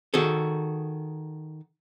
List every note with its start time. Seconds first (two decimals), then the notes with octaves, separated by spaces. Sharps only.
0.14 D#3 F#4 G#4 A4